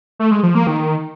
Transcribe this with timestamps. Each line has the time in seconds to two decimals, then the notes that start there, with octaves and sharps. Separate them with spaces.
0.19 A3
0.31 G#3
0.43 F3
0.55 A#3
0.67 D#3